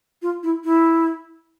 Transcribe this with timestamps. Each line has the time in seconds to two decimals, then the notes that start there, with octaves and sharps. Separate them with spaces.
0.22 F4
0.43 E4
0.64 E4